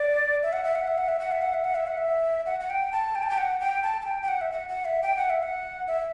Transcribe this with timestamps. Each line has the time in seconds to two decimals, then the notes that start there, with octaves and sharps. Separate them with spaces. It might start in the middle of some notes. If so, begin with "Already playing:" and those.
Already playing: D5
0.43 E5
0.53 F#5
0.64 E5
0.75 F#5
0.87 E5
0.98 F#5
1.08 E5
1.19 F#5
1.32 E5
1.42 F#5
1.54 E5
1.65 F#5
1.75 E5
1.87 F#5
1.97 E5
2.46 F#5
2.60 F#5
2.70 G5
2.92 A5
3.15 G5
3.23 A5
3.30 G5
3.38 F#5
3.60 G5
3.83 A5
4.02 A5
4.05 G5
4.22 G5
4.28 F#5
4.41 E5
4.52 F#5
4.69 F#5
4.85 E5
5.03 G5
5.16 F#5
5.30 E5
5.43 F#5
5.88 E5